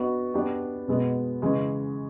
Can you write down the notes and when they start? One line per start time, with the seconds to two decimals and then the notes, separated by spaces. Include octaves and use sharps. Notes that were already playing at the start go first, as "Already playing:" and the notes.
Already playing: B3 D4 F#4 B4 D#5
0.34 B3 D4 G4
0.88 B2 G#3 B3
1.42 C#3 E3 G#3